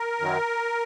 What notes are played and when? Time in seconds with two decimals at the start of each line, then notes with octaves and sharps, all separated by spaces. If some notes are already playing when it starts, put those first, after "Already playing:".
Already playing: A#4
0.19 F#2 D#3 F#3